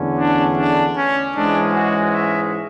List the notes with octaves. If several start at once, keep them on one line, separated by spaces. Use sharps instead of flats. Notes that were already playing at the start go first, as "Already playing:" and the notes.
Already playing: E2 D3 A3 C#4
D4
D4
C#4
G#2 E3 G#3 C#4 D4
F#4
E5